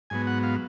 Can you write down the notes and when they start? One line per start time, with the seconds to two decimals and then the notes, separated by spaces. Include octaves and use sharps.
0.10 G#2 F#3 B3 G#5
0.27 F#5
0.43 F5